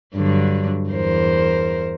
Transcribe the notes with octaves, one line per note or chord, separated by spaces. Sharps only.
G2 D3 F#3
E2 A#4 C5